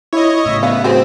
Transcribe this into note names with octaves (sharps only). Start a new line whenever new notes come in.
E4 C#5 D#5
A2 C#3 E5
B3 F5
C4 F#4 G#4 C5